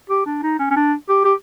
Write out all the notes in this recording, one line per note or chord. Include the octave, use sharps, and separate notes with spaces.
G4
D4
D#4
C#4
C#4
D4
G4
G4